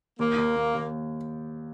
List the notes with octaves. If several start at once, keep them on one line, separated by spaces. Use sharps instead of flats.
D#2 A#3
D#2
D#2
D#2